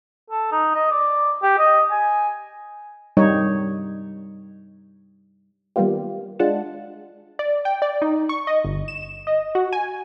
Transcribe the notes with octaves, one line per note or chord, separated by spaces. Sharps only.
A4
D#4
D#5
D5
G4
D#5
G#5
G3 D#4 C#5
D#3 G3 A#3 B3 F4 G4
G#3 D4 F4 F#5 A5
D5
G5
D5
D#4
C#6
D#5
G1
E7
D#5
F#4
G#5